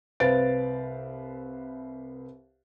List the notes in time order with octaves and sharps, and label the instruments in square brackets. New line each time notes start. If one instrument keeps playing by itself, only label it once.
[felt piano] C2 B4 C5 F5 A6 D7